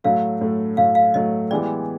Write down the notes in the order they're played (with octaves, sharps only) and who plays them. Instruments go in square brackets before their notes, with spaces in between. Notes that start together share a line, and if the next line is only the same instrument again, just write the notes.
[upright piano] A2 F#3 A3 [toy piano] F5
[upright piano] A2 F#3 A3
[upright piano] A2 F#3 A3 [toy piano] F5
[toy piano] F5
[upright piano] A2 F#3 A3 [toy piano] D#5
[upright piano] E3 G#3 B3 E4 G4 [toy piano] D5